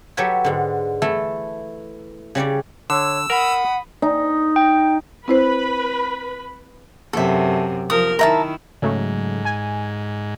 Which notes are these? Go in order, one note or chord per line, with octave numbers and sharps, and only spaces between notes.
F#3 G4 A4 B4 C#5
G#2 D3
E3 A3 E4 A4
C#3 G3 C#5 D5
D3 C#5 E6
A#4 F#5 B5 D#6
D#4
G5
C4 E4 B4 C5 B5
F#2 C3 A4 E5
F3 A#4 D#6
D#3 E4 A#4 E5 A5
G#2 C#3 F#3 A3
G#5